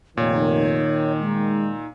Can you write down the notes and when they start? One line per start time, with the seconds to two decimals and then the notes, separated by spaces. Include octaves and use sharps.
0.17 F1 A#2 D#3 C#5
1.21 G#3 D#4